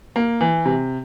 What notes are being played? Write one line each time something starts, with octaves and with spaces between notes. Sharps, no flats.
A#3
E3
C3